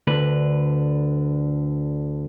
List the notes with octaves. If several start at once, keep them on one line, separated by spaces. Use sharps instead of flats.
D2 D3 B4